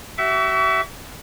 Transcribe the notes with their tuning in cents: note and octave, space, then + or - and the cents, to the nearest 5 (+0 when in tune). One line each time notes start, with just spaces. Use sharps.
F#4 +45 E5 +0 C#6 +40